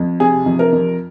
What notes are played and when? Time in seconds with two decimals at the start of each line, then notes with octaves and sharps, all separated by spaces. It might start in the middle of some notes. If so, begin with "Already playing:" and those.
Already playing: F2
0.20 C3 G#4
0.46 F2
0.59 A#4
0.72 F2